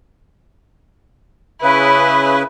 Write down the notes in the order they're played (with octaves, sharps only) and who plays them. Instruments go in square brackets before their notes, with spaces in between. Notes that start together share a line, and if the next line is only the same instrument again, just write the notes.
[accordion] C#3 B4 [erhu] E4